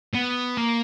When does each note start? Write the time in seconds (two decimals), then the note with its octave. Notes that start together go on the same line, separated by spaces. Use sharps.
0.15 B3
0.58 A#3